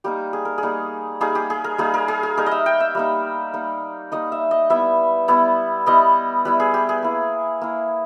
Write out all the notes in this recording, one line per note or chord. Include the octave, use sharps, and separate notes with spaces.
G3 A#3 D#4 G4
G#4
A#4
G#4
G3 A#3 D#4
G3 A#3 D#4 G#4
G4
G#4
A#4
G3 A#3 D#4 G#4
A#4
G#4
G#4
G3 A#3 D#4 A#4
D#5 E5
G5
E5
G3 A#3 D#4
G3 A#3 D#4
G3 A#3 D#4 D#5
E5
D#5
G3 B3 E4 E5
G3 B3 E4
G3 B3 E4 D#5
G3 B3 E4 B4
G#4
G4
G#4
A#3 E4
A#3 E4